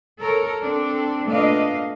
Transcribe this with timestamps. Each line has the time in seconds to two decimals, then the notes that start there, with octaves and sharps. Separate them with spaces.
0.19 A4 A#4 C#5
0.61 C4 D4 A4
1.26 A#2 A3 B3 D4 D#5 F5